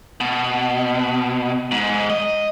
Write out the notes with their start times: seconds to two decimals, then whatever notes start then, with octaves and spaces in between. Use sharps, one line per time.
0.21 B2
1.72 G#2
2.10 D#5